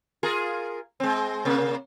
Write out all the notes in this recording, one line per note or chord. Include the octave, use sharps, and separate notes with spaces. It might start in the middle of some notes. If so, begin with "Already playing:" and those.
F4 G#4 A#4
G#3 C4
C3 A#3